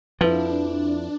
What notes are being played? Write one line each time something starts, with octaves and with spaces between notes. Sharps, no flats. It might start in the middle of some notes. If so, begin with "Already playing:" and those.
F2 F3 D4 E4 B4 F5